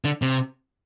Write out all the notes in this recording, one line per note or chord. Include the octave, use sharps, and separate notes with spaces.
D3
C3